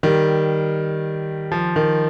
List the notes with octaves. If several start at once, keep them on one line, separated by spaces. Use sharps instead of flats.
D#3 G3
F3
D#3